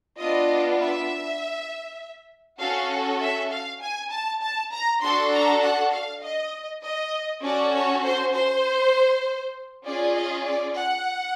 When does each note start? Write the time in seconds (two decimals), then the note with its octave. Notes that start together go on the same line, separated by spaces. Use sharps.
0.18 B3 D4 F4 D#5
0.79 E5
2.60 C#4 F#4 A4 F5
3.20 E5
3.51 F5
3.81 G#5
4.11 A5
4.42 A5
4.72 A#5
5.02 D4 F#4 A4 C6
5.32 A#5
5.62 F#5
5.92 F5
6.22 D#5
6.83 D#5
7.43 C#4 F#4 A4 D5
7.74 C#5
8.04 C5
8.34 C5
9.84 C#4 F4 G#4 D5
10.15 D#5
10.45 D5
10.75 F#5